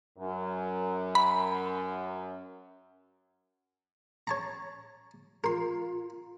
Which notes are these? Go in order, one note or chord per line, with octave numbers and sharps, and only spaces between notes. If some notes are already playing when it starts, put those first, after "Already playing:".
F#2
B5
C#5 A5 A#5
F4 A#4 C6